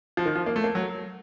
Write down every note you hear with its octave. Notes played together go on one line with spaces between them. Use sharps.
F3
D#3
F3
A#3
A3
A#3
F#3